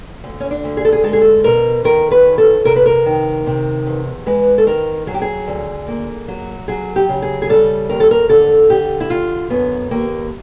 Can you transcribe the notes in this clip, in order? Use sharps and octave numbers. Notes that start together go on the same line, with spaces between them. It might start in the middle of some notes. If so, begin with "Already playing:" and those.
D2
C#4
D4
D2
G#4
A4
G#4
G#3 A4
G#4
A4
B2 A#4
D#3 A#4
B4
F#2
A4
C3 A#4
B4
A#4
D#3
C3
E2
G#3 B4
A4
D#3 A#4
F#3 G#4
G4
G#4
D2
A#3
F#3
F#3 G#4
G4
C#3
G#4
G#4
G3 A4
D#2 A#4
A4
A#4
D3 A4
D3 G4
E4
D3 F4
F#2 B3
D#2 A#3